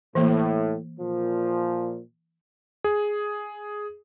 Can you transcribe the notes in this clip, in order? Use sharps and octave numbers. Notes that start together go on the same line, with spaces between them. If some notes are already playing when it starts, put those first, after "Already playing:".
A2 E3 A#3
A#2 F3
G#4